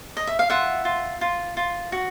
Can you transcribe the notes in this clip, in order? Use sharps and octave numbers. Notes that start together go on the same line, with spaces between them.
D#5
E5
F5
F4 E5 F#5
F4
F4
F4
F#4